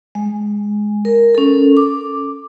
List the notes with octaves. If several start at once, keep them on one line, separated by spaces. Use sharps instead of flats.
G#3
A#4
C#4 A4
D6